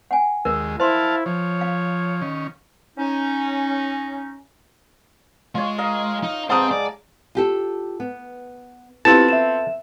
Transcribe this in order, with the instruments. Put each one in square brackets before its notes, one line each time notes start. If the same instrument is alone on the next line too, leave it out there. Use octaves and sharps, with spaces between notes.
[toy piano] F#5 G#5
[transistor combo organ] D#2 G#3 [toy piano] A#4
[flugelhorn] E4 [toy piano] C5 C6 [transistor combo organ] F5 A5
[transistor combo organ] F3 [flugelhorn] C#5
[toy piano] F5
[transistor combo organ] D#3 C#4
[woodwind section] C#4 D#4
[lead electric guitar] G#3 [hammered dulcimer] F4 C#5
[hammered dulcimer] A#4 D#5 F5
[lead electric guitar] D#4
[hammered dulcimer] G#2 [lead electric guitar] C4 C5 [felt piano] A5 A#5 D#6
[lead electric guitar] D5
[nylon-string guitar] F4 G4 A4
B3
[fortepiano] B3 C4 F4 [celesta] E4 G4 [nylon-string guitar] A4 [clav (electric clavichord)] A5
[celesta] E5 E7